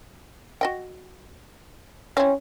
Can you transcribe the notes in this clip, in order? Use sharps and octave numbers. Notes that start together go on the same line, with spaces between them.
F#4 D#5 G5
C4 C#4 E4